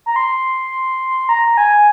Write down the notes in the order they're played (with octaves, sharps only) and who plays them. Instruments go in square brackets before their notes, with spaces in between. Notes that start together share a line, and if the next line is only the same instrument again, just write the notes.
[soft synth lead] A#5
C6
A#5
A#5
G#5